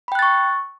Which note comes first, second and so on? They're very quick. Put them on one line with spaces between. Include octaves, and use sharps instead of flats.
B5 G5 F#6 A6 C#6